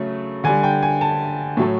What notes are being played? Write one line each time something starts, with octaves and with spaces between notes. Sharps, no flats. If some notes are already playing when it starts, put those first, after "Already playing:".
Already playing: C#3 F#3 A3
D3 G3 G#5
G5
G#5
A5
A2 F#3 A3